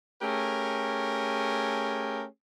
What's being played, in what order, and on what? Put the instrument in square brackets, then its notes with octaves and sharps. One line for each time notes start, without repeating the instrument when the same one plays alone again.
[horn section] A3 C#4 G4 G#4 A#4